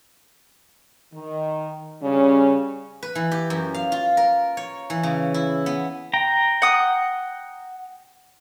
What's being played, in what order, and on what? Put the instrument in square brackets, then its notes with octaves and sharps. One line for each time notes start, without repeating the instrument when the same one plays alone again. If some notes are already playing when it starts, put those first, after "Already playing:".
[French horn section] D#3
C#3 G3 C#4
[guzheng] B4
E3
G4
F#2
F5
F4
A#4
C#5
E3
C#3
E4
B3
[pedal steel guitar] G5 A#5
[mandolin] F#5 D#6